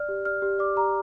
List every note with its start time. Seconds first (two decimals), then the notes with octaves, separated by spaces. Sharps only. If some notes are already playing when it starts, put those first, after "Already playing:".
Already playing: D5 F6
0.09 G4
0.25 D5 F6
0.42 G4
0.59 D5 D6
0.76 G4 A#5